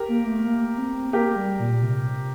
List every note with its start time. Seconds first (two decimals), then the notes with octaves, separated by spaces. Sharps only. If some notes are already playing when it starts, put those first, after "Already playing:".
Already playing: G4 A#4
0.08 A#3
0.26 A3
0.44 A#3
0.78 C4
1.13 A#3 G4 A#4
1.36 G3
1.60 A#2
1.82 C3